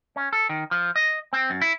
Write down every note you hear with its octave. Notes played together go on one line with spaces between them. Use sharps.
C#4
A4
D#3
F3
D#5
C4
F#2
E4